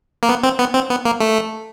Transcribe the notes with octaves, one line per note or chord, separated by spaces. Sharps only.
A#3
B3
C4
B3
C4
B3
A#3
A3